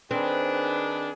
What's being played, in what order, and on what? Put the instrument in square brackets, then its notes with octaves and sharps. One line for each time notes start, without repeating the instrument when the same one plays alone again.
[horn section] D#3 D4 [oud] C4 [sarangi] G#4 [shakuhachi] B4